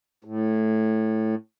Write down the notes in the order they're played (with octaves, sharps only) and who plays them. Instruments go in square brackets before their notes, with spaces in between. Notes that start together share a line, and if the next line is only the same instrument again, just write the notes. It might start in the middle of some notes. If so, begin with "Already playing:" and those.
[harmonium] A2